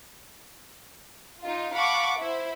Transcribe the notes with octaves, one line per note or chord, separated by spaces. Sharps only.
D#4 F4
F5 F#5 A5 B5 C#6 D6
E4 C5